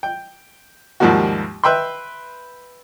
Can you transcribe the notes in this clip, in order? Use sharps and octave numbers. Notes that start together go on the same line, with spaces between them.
G5
D#2 G#2 F3 G3 A#3 F#4
B4 E5 G5 B5 C6